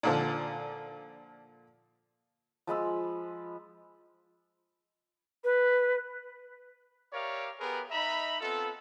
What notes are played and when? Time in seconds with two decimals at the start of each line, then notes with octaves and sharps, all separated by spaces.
0.03 A#2 D3 F3
2.67 F3 G#3 B5 E6
5.44 B4
7.13 G4 A#4 C#5 D5 E5 F5
7.60 B3 G4 G#4 A#4 B4
7.91 D#4 D#5 E5 A#5 B5
8.41 B3 C4 F4 A4